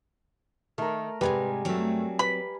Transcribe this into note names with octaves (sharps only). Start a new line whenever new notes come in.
D#3 A3 A#4
G#2 C3 G3 G#3 B4 G#5
G2 F#3 A3 C4
B4 B5